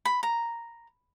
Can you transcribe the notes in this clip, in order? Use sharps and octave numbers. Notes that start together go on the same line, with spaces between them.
B5
A#5